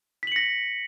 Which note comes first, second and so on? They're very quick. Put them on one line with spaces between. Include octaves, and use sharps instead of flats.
B6 F#7 C#7 A#6